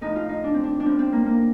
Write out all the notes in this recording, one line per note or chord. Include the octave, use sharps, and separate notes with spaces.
A2 F3 D#4
F4
D#4
D4
C4
D4
D4
A2 F3 C4
C4
A#3
A#3